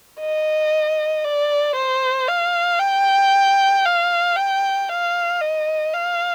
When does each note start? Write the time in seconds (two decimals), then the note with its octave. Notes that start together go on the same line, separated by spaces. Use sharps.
0.20 D#5
1.24 D5
1.75 C5
2.28 F5
2.79 G5
3.85 F5
4.36 G5
4.89 F5
5.41 D#5
5.94 F5